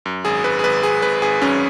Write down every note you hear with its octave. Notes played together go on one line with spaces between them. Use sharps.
F#2
G#1 G#4
G#1 B4
G#4
G#1 B4
G#1 G#4
G#1 B4
G#1 G#4
F#2 C#4